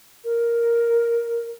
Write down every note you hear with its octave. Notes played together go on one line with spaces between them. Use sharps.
A#4